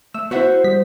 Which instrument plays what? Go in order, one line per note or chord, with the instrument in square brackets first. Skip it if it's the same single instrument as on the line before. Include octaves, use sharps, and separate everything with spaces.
[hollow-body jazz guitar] A3 [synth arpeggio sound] E6
[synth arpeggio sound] B3 E4 [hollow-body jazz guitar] F#4 E5 F#5 [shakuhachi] C5
[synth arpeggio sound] G3 B6